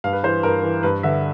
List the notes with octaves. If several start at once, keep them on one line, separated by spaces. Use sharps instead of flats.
G2 F5
B4
E3 C5
G2 A#4
E3
G2 B4
D3 E5